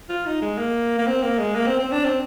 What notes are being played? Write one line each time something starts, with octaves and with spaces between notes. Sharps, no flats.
F4
D#4
G#3
A#3
A#3
C4
A#3
G#3
A#3
C4
C4
D4
C4